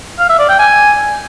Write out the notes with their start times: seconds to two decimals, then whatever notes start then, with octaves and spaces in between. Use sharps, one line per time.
0.19 F5
0.29 E5
0.39 D5
0.49 G5
0.59 G#5